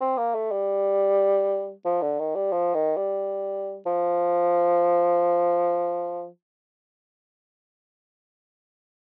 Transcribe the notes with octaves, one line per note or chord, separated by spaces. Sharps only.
C4
A#3
A3
G3
F3
D3
D#3
G3
F3
D#3
G3
F3